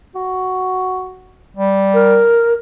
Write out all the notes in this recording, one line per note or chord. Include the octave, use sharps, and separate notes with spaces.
F#4
G3
A#4